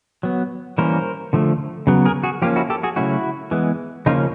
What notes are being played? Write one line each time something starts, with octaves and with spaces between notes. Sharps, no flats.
F#3 B3
E3 G3 A#3 C#4 A#4 C5
D3 F3 A3
C#3 F#3 B3
G#4 A#4
F#4 G#4
F3 A#3 C#4 F4 G4
E4 F#4
G4 A4
F#4 G#4
C#3 F#3 A3 C#4 E4 F#4
E3 G#3 B3
C#3 F3 A#3 C#4 D#4 F4